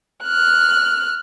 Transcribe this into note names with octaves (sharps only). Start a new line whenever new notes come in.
F6 F#6